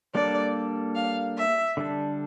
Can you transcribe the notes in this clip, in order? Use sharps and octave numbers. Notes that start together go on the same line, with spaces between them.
G3 A#3 D4 A4 D5
F5
E5
D3 G3 D4 A4